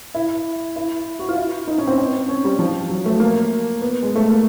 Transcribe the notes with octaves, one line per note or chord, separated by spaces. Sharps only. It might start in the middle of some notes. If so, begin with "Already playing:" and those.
E4
E4
F#4
F4
E4
D#4
C#4
C4
C4
C#4
G3
F3
F#3
A3
A#3
B3
G#3
A3
A#3